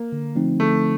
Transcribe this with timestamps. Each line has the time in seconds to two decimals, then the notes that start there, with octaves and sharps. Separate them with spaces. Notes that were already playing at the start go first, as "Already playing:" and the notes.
Already playing: A#3
0.12 D3
0.35 F3 A3 C4 D#4
0.60 D3 A3